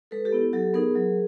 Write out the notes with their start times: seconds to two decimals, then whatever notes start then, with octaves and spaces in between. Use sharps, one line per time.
0.11 G#3 A4 B4
0.25 G4 A4
0.32 B3 E4
0.53 F#3 G4 A4
0.74 B3 D#4 G#4 A#4
0.95 F#3